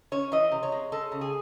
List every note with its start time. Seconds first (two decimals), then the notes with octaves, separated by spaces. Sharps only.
0.12 C#4 C#5
0.32 E3 D#5
0.52 C3
0.63 C#5
0.72 G#3
0.92 G#3 A4
1.12 C#3
1.21 G#4